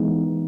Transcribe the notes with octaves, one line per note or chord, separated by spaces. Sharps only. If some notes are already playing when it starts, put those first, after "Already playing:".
Already playing: E3 G#3 B3 D#4